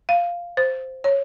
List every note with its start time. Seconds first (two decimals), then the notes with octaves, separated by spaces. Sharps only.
0.09 F5
0.57 C5
1.04 C#5